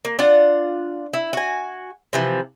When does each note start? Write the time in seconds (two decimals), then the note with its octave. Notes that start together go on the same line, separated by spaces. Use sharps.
0.05 A#3
0.19 D4 F4 F#5
1.13 E4
1.33 F#4 G#5
2.13 C3 E3 F3